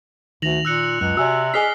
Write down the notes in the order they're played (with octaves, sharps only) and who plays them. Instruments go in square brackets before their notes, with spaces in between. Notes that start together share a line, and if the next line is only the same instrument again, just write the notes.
[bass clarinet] D2 [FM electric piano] D#3 [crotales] A#6 F7 F#7
[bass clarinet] A#2 [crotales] E6 F#6 C#7
[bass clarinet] C#2 [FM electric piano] F#2 [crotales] F#6
[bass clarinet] C3 [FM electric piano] F#4 [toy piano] D5 G#5 E6
[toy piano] D#4 G#4 G#5 [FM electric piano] D#5 F6 B6 [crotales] C7 G7